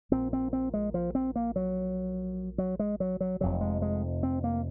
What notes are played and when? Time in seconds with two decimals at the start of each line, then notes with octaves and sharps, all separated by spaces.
0.11 A#1 A#2 C4
0.33 C4
0.53 C4
0.74 G#3
0.94 F3
1.15 C4
1.36 A#3
1.56 F#3
2.58 F#3
2.79 G#3
3.00 F#3
3.21 F#3
3.40 F1 F2 C3 F#3
3.61 G#3
3.82 G#3
4.23 C4
4.44 A#3